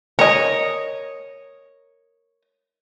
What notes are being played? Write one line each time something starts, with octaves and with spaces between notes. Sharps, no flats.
A#4 C#5 D#5